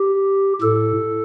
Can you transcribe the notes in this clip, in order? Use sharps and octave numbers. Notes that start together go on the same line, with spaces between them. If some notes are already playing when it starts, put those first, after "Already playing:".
Already playing: G4
A2 A4